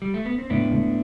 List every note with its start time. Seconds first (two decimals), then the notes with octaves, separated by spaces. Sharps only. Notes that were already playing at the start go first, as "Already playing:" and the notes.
0.02 G3
0.14 A3
0.25 B3
0.38 C4
0.50 A2 B3 D4
0.71 A2